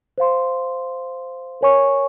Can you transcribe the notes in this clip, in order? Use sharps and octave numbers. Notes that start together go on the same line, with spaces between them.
C5 F5 C6
A#4 C#5 G#5 C#6